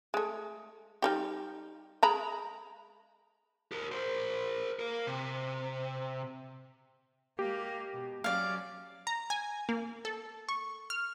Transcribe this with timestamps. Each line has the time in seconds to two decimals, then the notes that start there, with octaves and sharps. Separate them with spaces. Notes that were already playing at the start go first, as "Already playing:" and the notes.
0.14 G#3 A3
1.02 G3 D#4 G4
2.03 G#3 A#5 B5
3.72 G4 A#4
3.91 A#4 C5
4.79 A#3 A#4
5.07 C3
7.39 G#3 A#3 G4
7.93 B2
8.24 F#3 C#4 D5 F5
9.07 A#5
9.30 G#5
9.69 A#3
10.05 A4
10.49 C#6
10.90 F6